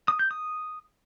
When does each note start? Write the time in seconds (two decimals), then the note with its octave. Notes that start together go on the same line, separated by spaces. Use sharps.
0.08 D#6
0.19 G6
0.31 D#6